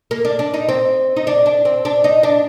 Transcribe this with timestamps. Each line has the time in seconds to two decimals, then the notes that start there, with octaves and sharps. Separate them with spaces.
0.11 A#3
0.25 D4
0.39 D4
0.54 D#4
0.69 C4
1.17 D#4
1.27 D4
1.46 D4
1.65 C4
1.85 D4
2.04 D#4
2.23 D4